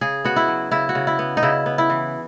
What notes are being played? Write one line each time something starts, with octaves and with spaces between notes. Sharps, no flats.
C#3 G#4
B3 F#4
E4
F#3
C#3 E4
F#4
C#3
E4
B3
D#4
C#3 E4
B3
E4
E3